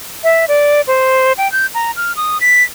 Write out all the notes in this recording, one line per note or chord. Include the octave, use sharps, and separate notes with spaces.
E5
D5
C5
G5
G6
A#5
F6
D#6
B6